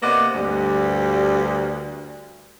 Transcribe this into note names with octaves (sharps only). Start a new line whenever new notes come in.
C3 A#3 B3 D5 D#5 F#5
D2 G2 G3